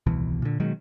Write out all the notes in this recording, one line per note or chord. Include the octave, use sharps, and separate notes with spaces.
D#1 C2 B2 E3
A#2 D3
B2 D#3 F#3 G#3